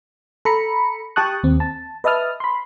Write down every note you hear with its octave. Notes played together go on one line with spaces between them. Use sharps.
A4 A#5 B5 C#7
G4 G5 A5 C#6 D#6 F#6
D#2 C4
A5
B4 D#5 E5 A5 D#6 F6
B5 C6